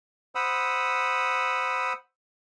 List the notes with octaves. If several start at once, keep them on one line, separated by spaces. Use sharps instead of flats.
C5 F#5 B5 D#6 E6